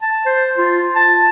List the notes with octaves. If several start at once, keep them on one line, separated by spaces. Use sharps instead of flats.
A5
C5
F4
A5